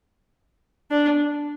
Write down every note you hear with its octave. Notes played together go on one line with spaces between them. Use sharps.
D4